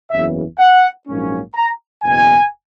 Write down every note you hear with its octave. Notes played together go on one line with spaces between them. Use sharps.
F#1 E2 C#3 E3 E5
F#5
A#1 G#2 F#3 A#3 C#4
A#5
F#1 E2 B2 G#5